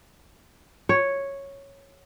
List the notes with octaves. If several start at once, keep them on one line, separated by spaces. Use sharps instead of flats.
C#5